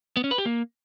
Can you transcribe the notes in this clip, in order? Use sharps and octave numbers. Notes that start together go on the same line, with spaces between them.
B3
C#4
B4
G4
A#3